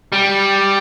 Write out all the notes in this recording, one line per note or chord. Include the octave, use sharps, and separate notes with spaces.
G3